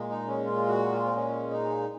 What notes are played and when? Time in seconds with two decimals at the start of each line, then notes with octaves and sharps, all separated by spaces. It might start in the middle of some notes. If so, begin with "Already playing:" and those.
Already playing: A#2 G#3
0.10 D#4
0.28 C#4
0.45 F4
0.68 F#4
0.92 F4
1.05 C4
1.16 C#4
1.51 D#4